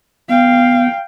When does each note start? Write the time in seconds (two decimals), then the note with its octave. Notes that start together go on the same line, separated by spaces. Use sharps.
0.29 B3 F5 G5